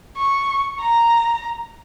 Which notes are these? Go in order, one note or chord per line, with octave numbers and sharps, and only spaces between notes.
C#6
A#5